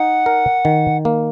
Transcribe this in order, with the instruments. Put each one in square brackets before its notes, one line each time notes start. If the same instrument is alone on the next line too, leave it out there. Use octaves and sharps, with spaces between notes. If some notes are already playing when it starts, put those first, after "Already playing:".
Already playing: [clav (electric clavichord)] D#4 [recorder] F#5
[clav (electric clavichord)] A#4
D#3
A#3